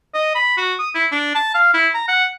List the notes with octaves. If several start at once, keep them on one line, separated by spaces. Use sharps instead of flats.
D#5
B5
F#4
D#6
E4
D4
A5
F5
E4
A#5
F#5